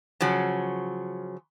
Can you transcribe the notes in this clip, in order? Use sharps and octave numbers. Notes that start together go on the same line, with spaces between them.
C#3 F3 F#3